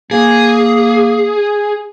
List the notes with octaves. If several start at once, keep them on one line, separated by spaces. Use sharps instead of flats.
A#3 G#4